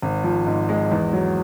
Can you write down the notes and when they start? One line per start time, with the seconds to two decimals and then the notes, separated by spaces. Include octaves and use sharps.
0.02 G#1
0.24 F3
0.47 G#2
0.69 G#3
0.92 E2
1.13 F#3